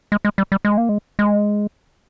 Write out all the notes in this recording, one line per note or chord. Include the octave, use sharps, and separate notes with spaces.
G#3
G#3
G3
G3
G#3
A#3
G#3
G#3